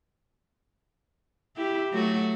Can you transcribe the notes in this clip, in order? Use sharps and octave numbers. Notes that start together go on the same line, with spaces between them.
E4 G4
F#3 A3 F#4